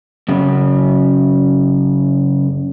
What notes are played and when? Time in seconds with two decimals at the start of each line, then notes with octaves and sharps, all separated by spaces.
0.29 F#2 C#3